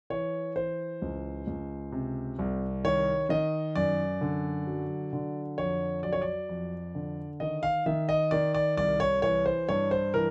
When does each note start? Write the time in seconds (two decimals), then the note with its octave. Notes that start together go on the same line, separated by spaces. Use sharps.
0.10 E3 C#5
0.56 E3 C5
1.02 C#2
1.47 C#2
1.92 C3
2.39 C2
2.85 D#3 C#5
3.29 D#3 D#5
3.76 F#2 D5
4.21 D3
4.67 F#3
5.13 D3
5.58 F2 C#5
6.03 F#3 D5
6.13 C#5
6.22 D5
6.49 F2
6.95 D3
7.40 D#3 D#5
7.63 F5
7.86 D#3 E5
8.09 D#5
8.31 D#3 D5
8.55 D5
8.77 C2 D5
9.00 C#5
9.22 E3 C#5
9.46 C5
9.69 G2 C#5
9.91 C5
10.14 E3 A#4